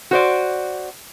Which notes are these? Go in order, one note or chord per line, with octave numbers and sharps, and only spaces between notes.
F#4 C5 D5